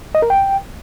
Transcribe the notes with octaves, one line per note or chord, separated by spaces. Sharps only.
D#5
A#4
G5